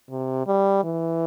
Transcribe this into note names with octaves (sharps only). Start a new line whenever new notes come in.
C3
G3
E3